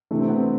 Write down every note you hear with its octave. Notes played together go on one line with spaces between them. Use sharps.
C3 E3 A3 D4
C4
B3
C4